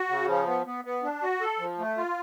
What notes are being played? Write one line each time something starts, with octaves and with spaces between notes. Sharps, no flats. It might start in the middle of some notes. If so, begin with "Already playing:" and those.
Already playing: F#4
C#3
F3
B3
B3
B3
D4
F#4
A4
F3
A3
F4